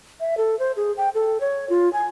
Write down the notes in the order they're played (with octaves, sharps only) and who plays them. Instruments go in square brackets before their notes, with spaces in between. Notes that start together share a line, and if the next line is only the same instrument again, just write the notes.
[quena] E5
A4
C5
G#4
G5
A4
C#5
F4
G#5